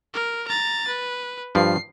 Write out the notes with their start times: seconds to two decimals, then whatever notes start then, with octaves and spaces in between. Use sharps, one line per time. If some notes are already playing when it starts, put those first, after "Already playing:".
0.14 A#4
0.48 A#5 A6
0.88 B4
1.55 G2 F3 C7